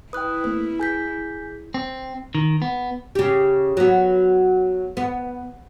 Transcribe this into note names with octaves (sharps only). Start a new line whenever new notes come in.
E4 B4 G5 D#6 F#6
A3 A#3 C4 B4
G#4 G#5 G6 B6
C4
D#3
B3
C#3 G4
F#3 B3
B3